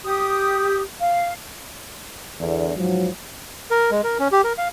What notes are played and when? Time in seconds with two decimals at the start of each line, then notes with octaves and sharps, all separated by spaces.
0.05 G4 D#6
1.01 F5
2.39 E2 D3
2.75 G#2 F3 F#3
3.71 A#4
3.91 G#3
4.04 A#4
4.19 C#4
4.32 G4
4.44 A#4
4.58 F5